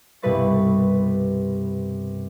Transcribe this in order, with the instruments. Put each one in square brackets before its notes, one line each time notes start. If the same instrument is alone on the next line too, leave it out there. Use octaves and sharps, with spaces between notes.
[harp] C2 G2 B2 B4 C#6 A6